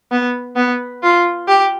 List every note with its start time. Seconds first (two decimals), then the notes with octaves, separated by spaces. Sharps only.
0.11 B3
0.56 B3
1.03 F4
1.48 G4